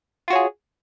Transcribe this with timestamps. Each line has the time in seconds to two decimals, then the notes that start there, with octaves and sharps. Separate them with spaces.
0.28 F4
0.30 F#4
0.33 C#5
0.35 G#4